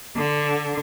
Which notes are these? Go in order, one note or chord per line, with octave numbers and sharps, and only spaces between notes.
D3